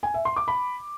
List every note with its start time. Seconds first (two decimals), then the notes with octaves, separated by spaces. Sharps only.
0.03 G#5
0.14 E5
0.25 C6
0.36 D6
0.48 B5